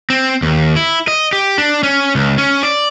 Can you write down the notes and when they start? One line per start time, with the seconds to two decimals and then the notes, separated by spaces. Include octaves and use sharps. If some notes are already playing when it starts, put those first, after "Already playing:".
0.10 C4
0.42 D#2
0.76 E4
1.08 D#5
1.33 G4
1.58 D4
1.83 C#4
2.15 C#2
2.38 C#4
2.63 D5